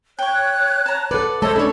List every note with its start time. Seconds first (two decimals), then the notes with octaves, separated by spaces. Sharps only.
0.19 C#5 G5 C#6 F#6
0.86 A5 A#5
1.11 A4 B4 D5 F#5
1.42 A3 A4 C5 C#5 D#5 E6
1.56 C#4 D4 E4 A4 C#5